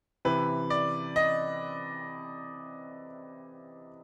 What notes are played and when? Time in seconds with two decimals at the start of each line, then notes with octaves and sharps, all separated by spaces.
0.25 C3 E3 B4
0.70 D5
1.16 D#5